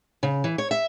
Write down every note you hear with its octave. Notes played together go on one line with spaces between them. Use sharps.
C#3
E3
C#5
E5